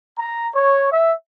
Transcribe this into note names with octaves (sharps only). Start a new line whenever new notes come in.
A#5
C#5
E5